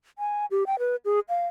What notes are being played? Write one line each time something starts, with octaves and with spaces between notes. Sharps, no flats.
G#5
G4
G5
B4
G#4
F5